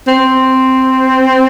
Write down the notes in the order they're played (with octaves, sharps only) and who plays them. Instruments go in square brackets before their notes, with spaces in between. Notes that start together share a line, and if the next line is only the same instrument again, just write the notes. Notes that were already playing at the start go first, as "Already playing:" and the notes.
[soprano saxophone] C4